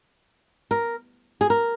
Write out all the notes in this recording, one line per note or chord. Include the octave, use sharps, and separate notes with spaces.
A#4
G#4
A#4